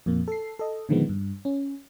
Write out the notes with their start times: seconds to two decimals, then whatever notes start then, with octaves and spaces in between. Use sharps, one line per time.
0.06 F2 A#2 A#3
0.28 A4 C7
0.59 A4 D#5
0.89 A#2 D3 D#3 F3 G#3 B3
1.09 G2
1.45 C#4